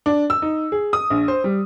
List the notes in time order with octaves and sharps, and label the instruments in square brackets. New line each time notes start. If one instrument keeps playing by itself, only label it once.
[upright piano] D4
E6
D#4
G#4
D#6
A#1
C5
G3